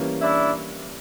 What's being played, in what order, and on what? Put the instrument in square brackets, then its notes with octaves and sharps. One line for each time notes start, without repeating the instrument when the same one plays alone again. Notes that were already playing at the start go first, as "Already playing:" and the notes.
Already playing: [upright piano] E3 G3 A#3 C#4
[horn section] D4 E4